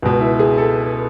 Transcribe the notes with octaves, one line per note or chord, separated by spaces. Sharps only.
C#2 B2
E4
G#4
A4